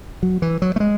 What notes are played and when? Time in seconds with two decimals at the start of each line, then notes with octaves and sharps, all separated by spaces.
0.23 F#3
0.42 E3
0.62 F#3
0.76 A3
0.80 G#3